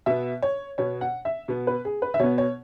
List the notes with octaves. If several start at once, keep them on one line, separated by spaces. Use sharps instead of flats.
B2 B3 E5
C#5
B2 B3 C#5
F#5
E5
B2 B3
B4
G#4
B4
E5
B2 B3 C#5
C#5